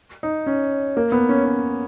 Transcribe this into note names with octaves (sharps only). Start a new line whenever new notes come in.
D#4
C#4
A#3
B3
C#4
C#4